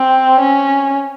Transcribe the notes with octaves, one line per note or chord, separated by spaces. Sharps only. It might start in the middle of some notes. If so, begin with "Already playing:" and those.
Already playing: C4
C#4